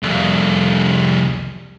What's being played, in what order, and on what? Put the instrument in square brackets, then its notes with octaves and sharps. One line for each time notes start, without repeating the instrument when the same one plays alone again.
[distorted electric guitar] C2 F2